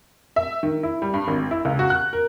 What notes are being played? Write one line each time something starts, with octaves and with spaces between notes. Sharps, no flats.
E5
D#3
E4
G3
G2
G#1
E4
C#2
F#4
F#6
A#4